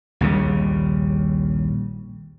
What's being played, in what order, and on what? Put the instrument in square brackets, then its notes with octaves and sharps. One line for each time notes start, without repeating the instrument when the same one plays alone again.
[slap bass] A#1 D#2 C#3 G3